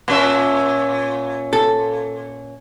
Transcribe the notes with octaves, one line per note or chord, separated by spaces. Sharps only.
A#2 C#4 E5
A4